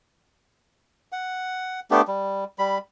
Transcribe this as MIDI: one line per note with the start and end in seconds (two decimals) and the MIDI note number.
1.12 1.80 78
1.91 2.01 57
1.91 2.01 59
1.91 2.01 62
1.91 2.01 67
2.08 2.44 55
2.59 2.78 55
2.59 2.78 83